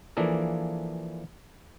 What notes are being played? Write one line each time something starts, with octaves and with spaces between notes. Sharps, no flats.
E3 F3 A#3 D4 G#4 A4